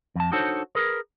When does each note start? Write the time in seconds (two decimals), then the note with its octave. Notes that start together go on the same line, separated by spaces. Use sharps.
0.16 F2 A5
0.31 D4 D#4 F#4 A4 C5 C#5
0.75 G#4 A#4 B4